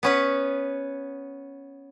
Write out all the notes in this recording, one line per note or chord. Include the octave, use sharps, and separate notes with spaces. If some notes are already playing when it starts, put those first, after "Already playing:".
B3 C#4 B4